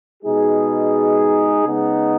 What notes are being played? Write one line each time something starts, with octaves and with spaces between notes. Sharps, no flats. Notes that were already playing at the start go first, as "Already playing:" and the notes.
B2 G#3 D#4 G#4
C#3 G#3 B3 D#4